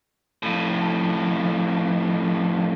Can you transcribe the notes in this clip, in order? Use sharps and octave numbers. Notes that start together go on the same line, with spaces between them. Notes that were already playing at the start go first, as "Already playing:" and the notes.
F2 A2